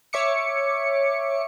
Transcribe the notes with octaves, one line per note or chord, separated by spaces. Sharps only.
C#5 E5 D6 C#7